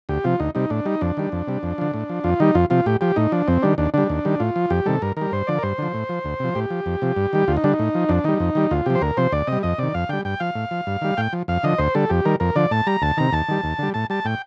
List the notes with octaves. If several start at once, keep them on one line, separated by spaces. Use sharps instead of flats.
D2 G4
C3 F3 F4
D2 D#4
C3 G3 D#4
A2 D4
G3 D#4
F2 D4
D#3 G3
F2
C3 G3
F2
D3 F3
A2
F3
F2 F4
D#3 G3 D#4
F2 F4
C3 F3 F4
A2 G4
F3 G4
A2 D#4
F3 D4
F2 C4
D#3 G3 D4
D#2 D4
D3 G3 D4
D#2
D#3 G3
A2 F4
F3
F2 G4
C3 D#3 G3 A4
G2 A#4
D#3 G3 A#4
G2 C5
D3 F3 D5
A#4
G2 C5
D3 F3
A2
F3
D2
C3 F3
A2 G4
F3
F2
C3 F3
G2
D#3 G3
D2 F4
D#4
D3 G3 D4
D#4
A2
F3
F2 D4
D#3 G3 D#4
F2
D#3 G3
D2 F4
C3 F3 G4
C5
D2 A#4
C3 F3 C5
D2 D5
C3 G3 D#5
F2 D#5
C3 D#3 D5
F2 F5
D3 G3 G5
G2 G5
F3 F5
A2
F3
G2
D#3 G3
A2 G5
F3
F2 F5
D3 F3 D#5
D2 C5
D3 G3 A4
F2 G4
D#3 G3 A#4
F2 A#4
D3 F3 D5
A2 A5
G3 A#5
D2 A5
C3 D#3 A#5
D#2 A5
D#3 G3
D#2
D3 G3
A2 A5
G3 A5
A2 G5